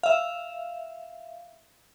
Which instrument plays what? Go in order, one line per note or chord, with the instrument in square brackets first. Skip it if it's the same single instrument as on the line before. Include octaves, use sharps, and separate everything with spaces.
[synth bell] E5 F5